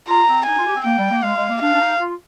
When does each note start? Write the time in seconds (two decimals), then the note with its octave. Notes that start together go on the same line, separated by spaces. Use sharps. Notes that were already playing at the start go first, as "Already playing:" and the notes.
0.08 F4 A#5
0.27 C4
0.46 D#4 G#5
0.58 F4
0.66 G4
0.76 C4
0.85 A#3 G5
0.98 G3
1.11 A#3
1.23 G#3 F5
1.36 G#3
1.49 A#3
1.61 D4 F5
1.73 D4
1.80 D#4
2.00 F4